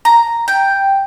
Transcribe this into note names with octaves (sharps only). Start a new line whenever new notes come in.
A#5
G5